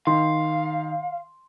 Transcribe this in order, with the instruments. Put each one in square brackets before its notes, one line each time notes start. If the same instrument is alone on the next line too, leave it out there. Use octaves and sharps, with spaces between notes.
[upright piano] D#3 [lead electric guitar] F5 [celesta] C6